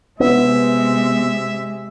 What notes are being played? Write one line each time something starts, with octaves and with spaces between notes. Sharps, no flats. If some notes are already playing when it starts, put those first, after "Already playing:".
C3 G#3 B3 E5